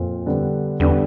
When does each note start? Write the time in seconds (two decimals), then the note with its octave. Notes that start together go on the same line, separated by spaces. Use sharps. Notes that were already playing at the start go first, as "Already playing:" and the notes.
Already playing: F2 A#2 C4 F4
0.26 D3 G3 B3 D4
0.80 E2 D3 G3 B3 D4